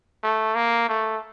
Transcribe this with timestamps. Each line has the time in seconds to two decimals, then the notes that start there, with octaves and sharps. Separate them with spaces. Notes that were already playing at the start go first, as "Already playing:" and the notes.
0.23 A3
0.55 A#3
0.88 A3